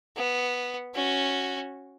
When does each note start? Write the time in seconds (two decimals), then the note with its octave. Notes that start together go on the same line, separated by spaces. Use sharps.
0.16 B3
0.95 C#4 F#4